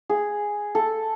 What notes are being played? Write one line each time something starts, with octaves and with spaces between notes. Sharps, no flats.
G#4
A4